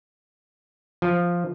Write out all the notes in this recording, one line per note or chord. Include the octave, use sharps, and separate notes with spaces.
F3